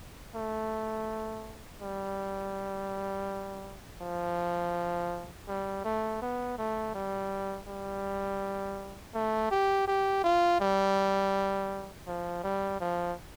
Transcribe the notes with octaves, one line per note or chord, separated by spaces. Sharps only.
A3
G3
F3
G3
A3
B3
A3
G3
G3
A3
G4
G4
F4
G3
F3
G3
F3